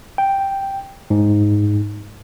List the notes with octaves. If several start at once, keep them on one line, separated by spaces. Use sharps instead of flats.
G5
G#2